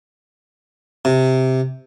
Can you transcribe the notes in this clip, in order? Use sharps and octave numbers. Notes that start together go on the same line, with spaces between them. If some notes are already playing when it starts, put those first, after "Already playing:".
C3